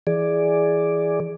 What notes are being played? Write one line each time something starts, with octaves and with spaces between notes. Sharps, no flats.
E3 G#4 D5